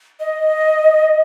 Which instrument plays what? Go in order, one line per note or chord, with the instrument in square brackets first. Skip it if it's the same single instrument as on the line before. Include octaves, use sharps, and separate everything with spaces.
[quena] D#5